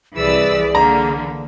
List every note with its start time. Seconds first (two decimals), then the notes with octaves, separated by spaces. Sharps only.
0.16 C2 E3 G#4 B4 D5 E6
0.75 D3 E3 A#3 A#5